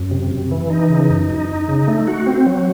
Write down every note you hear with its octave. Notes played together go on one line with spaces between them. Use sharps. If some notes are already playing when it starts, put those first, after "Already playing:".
Already playing: F#2
C3
C3
E3
D#4
C#3
F#2
D#4
D#4
C#3
A3
F#4
C4
F#3